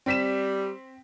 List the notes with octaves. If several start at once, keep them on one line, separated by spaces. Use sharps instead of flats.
G3 C4 B6 E7